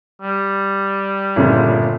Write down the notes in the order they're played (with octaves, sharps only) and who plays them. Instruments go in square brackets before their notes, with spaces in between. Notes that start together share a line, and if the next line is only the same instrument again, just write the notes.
[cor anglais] G3
[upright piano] G1 A#2 C#3